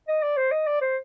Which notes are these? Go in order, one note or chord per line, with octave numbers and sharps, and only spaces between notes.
D#5
D5
C5
D#5
D5
C5